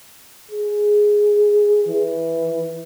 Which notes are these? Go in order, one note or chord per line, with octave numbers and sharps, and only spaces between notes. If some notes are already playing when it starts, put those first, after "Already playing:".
G#4
E3